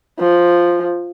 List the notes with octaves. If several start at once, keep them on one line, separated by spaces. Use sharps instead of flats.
F3